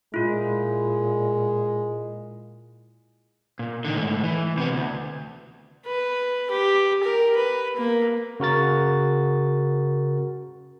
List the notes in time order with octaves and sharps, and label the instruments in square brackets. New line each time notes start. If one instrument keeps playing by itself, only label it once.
[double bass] A#2 [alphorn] G#3 [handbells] E4 F4
[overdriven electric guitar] A#2
D3 D#3
G#2 A3
E3
C3 B3
D2
[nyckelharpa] B4
G4
A#4
B4
A#3
[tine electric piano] C#3 F#4 A#4 A6